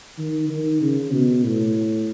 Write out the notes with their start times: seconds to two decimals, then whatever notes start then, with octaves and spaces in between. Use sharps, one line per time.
0.18 D#3
0.49 D#3
0.81 C#3
1.13 B2
1.45 A2